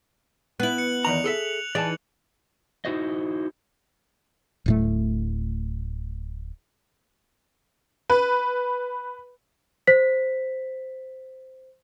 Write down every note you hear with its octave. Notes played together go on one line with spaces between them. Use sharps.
B3 E4 F#6 F#7
C#7
E2 D#3 A#5 F7
G#4 A4 E5
E3 D#4 G#4 D5 A5
D#4 E4 F#4 C5 D#5
D1 A2 A3
B4
C5 B6